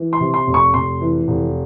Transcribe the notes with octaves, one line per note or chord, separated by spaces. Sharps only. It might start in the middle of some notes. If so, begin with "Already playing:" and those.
Already playing: E3
C6
C3
C6
F1
C#6
F1 C6
E3
F1